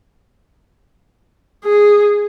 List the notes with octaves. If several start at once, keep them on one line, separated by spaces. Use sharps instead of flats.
G#4